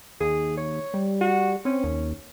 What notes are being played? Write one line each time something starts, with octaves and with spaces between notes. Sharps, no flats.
D#2 G#4
C#5
G3
F#4
C4 C#4
D#2